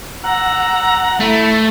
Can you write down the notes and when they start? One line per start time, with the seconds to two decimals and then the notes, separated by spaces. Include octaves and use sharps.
0.24 F#5 A#5 E6
1.20 A3 E4